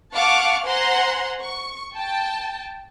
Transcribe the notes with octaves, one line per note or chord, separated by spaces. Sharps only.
F5 F#5 A5 C#6 D6 F6
C5 F#5 G#5 A#5 C6
C#6
G5 A5